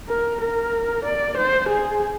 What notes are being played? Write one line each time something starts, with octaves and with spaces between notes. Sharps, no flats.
A#4
A#4
D5
C5
G#4